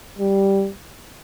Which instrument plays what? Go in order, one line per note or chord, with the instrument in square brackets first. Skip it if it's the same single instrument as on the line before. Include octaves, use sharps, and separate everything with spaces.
[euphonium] G3